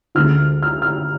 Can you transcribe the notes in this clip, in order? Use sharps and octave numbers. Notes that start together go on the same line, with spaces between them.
D2 D3 G#3 F6
F6
F6